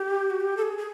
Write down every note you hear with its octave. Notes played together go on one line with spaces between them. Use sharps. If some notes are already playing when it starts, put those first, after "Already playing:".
Already playing: G4
F#4
G4
A4
G#4
G#4